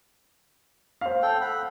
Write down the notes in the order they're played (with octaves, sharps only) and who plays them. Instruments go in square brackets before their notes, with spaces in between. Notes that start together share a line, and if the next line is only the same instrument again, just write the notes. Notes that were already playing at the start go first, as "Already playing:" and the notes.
[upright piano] C5 F5
[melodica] A4 G5
F#5 B5